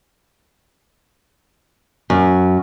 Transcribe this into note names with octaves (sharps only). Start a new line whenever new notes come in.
F#2